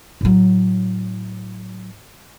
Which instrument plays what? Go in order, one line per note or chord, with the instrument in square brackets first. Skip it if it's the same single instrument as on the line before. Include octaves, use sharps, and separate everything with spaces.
[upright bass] A2 F#3